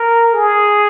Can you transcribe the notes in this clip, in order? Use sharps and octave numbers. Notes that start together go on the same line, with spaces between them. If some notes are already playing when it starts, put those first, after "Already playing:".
Already playing: A#4
G#4